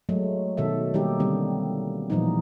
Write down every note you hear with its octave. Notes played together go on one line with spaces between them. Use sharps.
F#3 G#3 A3
B2 D#3 A4 E5
D#3 G3 A#3 D#4 G4
D3 G3 B3 C4
A#2 E3 F3 G3 B3 D#4